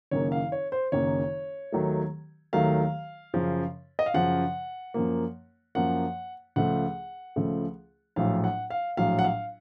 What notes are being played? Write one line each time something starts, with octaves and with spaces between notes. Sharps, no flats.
F#1 F#2 D#3 A#3 C#5
F5
C#5
C5
F#1 F#2 D#3 A#3 C#5
D#2 D#3 F#3 A3
D#2 D#3 F#3 A3 F5
F#2 C#3 F3
D#5
F5
F#2 C#3 F3 F#5
F#2 F3 A#3
F#2 F3 A#3 F#5
C#2 C#3 F3 A3 F#5
C#2 C#3 F3 A3
A#1 A2 F#3 F5
F#5
F5
A#1 A2 F#3 F5
F#5
F5